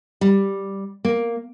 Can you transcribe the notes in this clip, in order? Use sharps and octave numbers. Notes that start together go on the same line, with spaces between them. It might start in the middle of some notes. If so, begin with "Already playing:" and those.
G3
A#3